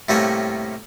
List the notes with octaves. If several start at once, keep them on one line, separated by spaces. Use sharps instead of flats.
A2 C3 G3 A3 A#3 C#4